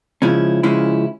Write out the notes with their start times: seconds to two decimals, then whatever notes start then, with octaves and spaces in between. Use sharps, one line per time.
0.22 C#3 F3 G#3 C#4 E4
0.63 C#3 F3 G#3 C#4 E4